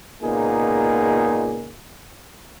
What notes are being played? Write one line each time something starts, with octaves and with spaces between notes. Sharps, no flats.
C#2 A#2 A#3 B3 D#4 G#4